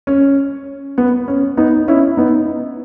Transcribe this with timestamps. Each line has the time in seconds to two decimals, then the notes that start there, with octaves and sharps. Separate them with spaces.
0.07 C#4
0.98 B3
1.28 C#4
1.57 B3 D#4
1.88 C#4 E4
2.17 B3 D#4